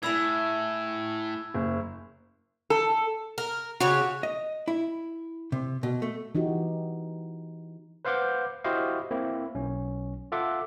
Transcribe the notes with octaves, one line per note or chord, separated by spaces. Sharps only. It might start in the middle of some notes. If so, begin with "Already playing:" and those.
A2 E4 G#4 E5 B5 E6 G#6
F#1
A4
A#4
C#3 F#4 G4 C#5
D#5
E4
C3
B2
A3
E3 D#4 F#4 G4
B4 C5 F5 F#5 D6 G6
E4 F#4 G4 C5 D#5 F5
A#3 C4 E4
B1 C#4
F4 A4 E5 F#5 D6